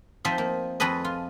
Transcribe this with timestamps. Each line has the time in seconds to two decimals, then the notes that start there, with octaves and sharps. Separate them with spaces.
0.25 F3 C4 D#4 C5 D#5 E5
0.38 A#3
0.80 F2 G#4 A4 B4 D#5
1.05 F4